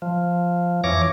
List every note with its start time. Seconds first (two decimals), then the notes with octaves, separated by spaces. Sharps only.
0.02 F3
0.84 F2 E3 C#5 D6 A#6